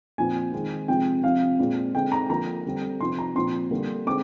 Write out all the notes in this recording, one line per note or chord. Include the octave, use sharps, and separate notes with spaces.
A#2 F3 C4 G#5
D#3 G#3 C4
C3 F3 G#3 C4 G5
C3 F3 C4 F5
A#2 G#3 C4
D3 G#3 C4 G5
A#5
D3 F3 A#3 A#5
D3 G3 C4
C3 F3 C4 C6
A#5
A#2 F3 C4 C6
D3 G3 A#3
D3 G#3 C4 D6